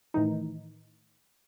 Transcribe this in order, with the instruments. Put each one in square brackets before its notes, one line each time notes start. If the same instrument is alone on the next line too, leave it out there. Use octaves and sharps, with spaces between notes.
[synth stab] A2 D#3 E3 D#4